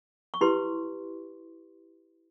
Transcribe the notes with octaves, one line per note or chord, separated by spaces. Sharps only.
C#6
E4 G4 B4 C6